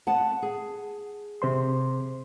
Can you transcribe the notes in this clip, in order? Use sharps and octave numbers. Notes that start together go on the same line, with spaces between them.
B3 F#5 A5
G#4
C3 C5 C6